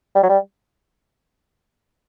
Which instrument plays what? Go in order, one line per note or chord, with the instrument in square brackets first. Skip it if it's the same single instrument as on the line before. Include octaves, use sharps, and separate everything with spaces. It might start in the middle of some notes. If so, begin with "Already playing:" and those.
[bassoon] G3
F#3
G3